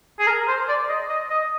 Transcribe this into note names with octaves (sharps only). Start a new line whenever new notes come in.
G#4
A#4
C5
D5
D#5
D#5
D#5